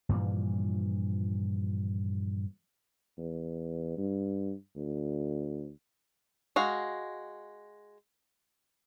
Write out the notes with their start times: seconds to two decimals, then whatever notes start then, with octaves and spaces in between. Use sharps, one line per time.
0.09 G2 A#2 E3 F3
3.18 E2
3.97 G2
4.76 D2
6.56 G#3 F#4 F5